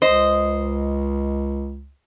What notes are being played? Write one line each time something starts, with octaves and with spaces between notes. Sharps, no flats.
C#2 C5 D#5